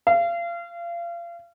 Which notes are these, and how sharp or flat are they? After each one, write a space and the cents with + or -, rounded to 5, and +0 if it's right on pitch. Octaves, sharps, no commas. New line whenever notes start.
F5 -30